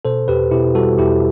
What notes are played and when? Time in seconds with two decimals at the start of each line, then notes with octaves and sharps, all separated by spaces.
0.05 B2 A4 C5
0.28 E2 G4 B4
0.51 B2 E4 G4
0.75 G3 F#4 A4
0.98 E2 E4 G4